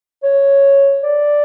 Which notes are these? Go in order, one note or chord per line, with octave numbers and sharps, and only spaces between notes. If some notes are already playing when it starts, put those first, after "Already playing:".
C#5
D5